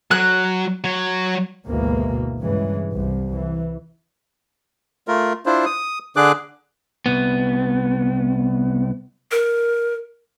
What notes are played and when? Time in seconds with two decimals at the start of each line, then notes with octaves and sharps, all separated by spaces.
0.11 F#3 F#6
0.84 F#3 C#5
1.66 G#1 D2 B2 E3 G#3 A#3
2.41 G2 C#3 E3 G#3
2.93 C2
3.33 E3
5.08 A3 F4 A#4
5.46 D4 E4 F4 C5
5.66 D#6
6.16 D3 D4 G#4 D6 F#6
7.06 C2 B3
9.31 A#4